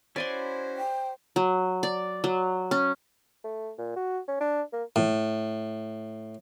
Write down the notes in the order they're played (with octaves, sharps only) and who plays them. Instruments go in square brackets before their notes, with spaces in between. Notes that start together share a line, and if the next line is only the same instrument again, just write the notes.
[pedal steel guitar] C#4 E4 F#4 [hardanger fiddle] C5 [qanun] D5 G#5 C6
[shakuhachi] G5
[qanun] F#3
D5
F#3
C#4
[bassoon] A3
A#2
F#4
C#4
D4
A#3
[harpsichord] A2